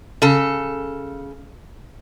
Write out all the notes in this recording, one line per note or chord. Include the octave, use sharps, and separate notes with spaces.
C#3 A4